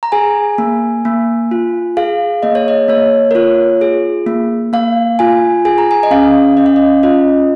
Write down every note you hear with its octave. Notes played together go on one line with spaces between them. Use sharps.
A#5
G#4 G#5
A#3
A#3
F4
G#4 F5
A#3 D#5
C#5
D#5
A#3 C#5
A#4
F4 C#5
G#4
A#3
A#3 F5
F4 G#5
G#4 G#5
A#5
G#5
D#5
C#4 F5
C#4 D#5
F5
D#5
F4 D#5